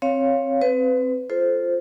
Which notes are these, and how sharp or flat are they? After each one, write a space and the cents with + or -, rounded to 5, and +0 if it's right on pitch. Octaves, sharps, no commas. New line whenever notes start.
C4 +20 C#5 +0 F5 +0
C4 +0 B4 +30
F4 -5 A4 -15 C5 +0